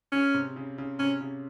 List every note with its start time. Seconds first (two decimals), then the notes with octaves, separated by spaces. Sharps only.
0.12 C#3 C#4
0.34 C3
0.56 C#3
0.78 C#3
0.99 C3 C#4
1.20 C#3